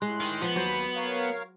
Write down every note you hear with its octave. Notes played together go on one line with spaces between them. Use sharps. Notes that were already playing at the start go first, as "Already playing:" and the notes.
A2 G#3 C6 F#6
D#3
F3 B3
D#2 F#3 C5 B5
A#4 C#5 F5